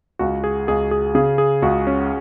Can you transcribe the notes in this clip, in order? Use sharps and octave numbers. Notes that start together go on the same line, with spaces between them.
C#2 F#4
G#4
C#2 G#4
G#4
C#3 G#4
G#4
C#2 F#4
C#4